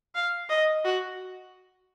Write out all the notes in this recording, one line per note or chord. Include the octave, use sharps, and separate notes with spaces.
F5
D#5
F#4